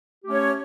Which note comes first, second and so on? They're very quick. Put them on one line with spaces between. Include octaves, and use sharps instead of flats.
G4 A3 C#4 C#5